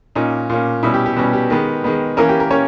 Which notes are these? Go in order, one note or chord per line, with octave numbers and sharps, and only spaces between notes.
A#2 A#3 C#4 D#4
A#2 A#3 C#4
B2 G3 C#4 E4
G4
G4
B2 G3 C#4
G4
D#3 G#3 B3
D#3 G#3 B3
E3 A#3 C#4 A#4
G4
A#4
A#3 C#4 C#5